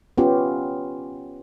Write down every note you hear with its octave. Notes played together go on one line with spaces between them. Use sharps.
B3 C#4 F4 G4